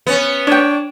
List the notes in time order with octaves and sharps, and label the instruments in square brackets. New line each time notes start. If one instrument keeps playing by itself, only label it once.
[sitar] B3 C#4
[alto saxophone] D4 [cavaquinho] C#5 G5